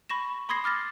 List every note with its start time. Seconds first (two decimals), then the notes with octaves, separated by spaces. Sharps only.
0.09 B5 C#6 A#6 E7
0.49 B5 C6 D#6 G#6 A#6 C7
0.64 D6 F6 A6 A#6